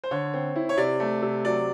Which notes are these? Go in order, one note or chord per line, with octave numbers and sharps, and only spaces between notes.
C5
D3 C#5
C4
E4
C#5
C3 D5
A3
C3
F#3 D5